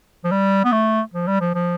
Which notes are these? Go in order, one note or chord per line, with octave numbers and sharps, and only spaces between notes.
F3
G3
B3
A3
F3
G3
F3
F3